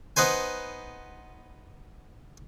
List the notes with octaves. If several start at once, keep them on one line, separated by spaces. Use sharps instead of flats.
B3 D#4 B4 C5 G#5